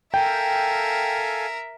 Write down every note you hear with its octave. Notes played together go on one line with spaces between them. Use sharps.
A4 A#4 E5 F5 G5 G#5